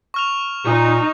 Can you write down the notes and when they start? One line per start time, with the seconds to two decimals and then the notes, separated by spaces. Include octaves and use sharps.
0.14 C#6 F6 F7
0.66 A#2 D#4